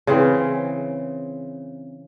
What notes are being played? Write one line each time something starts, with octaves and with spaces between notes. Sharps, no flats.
C#3 E3 C4